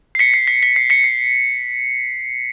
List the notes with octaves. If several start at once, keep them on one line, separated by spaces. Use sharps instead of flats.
C7
B6 C#7
C7
B6
B6
C7
B6 C#7
C7